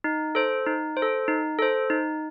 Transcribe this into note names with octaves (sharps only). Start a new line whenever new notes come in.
D#4
A4 C5
D#4
C5
A4
D#4
A4 C5
D#4